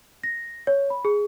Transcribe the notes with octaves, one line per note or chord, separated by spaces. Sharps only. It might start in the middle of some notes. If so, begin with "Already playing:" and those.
A#6
C#5
B5
G#4